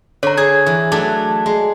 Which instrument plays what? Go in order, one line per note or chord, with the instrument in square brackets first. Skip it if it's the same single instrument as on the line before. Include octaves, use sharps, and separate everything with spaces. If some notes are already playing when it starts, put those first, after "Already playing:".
[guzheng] D3 [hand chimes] C#5 A#5
[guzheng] G#4 [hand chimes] G#6
[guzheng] E3
F#3 A3 D4
G#3